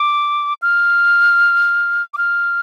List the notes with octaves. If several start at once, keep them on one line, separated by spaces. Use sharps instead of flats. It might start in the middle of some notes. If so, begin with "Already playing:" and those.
Already playing: D6
F6
D6
F6